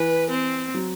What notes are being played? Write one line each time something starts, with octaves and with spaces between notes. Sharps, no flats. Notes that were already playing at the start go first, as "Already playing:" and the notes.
Already playing: E3 B4
C4
F#3